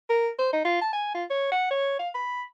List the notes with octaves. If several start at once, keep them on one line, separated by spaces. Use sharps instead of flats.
A#4
C5
D#4
F4
A5
G#5
F4
C#5
F#5
C#5
F5
B5